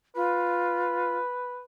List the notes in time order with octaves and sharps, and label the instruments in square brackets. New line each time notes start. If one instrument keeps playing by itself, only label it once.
[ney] F4 [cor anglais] B4